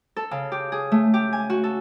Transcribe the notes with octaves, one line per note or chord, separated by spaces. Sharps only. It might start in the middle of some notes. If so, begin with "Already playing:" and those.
A4
C#3
G4
G#4
A3
G4
G#5
F#4
A4